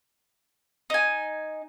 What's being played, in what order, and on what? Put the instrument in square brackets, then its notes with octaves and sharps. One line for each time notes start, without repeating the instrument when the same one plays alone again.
[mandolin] D#4 G#5